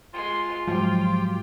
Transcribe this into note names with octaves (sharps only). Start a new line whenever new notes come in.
G#3 F4 C6
G#2 F3 F#3 G4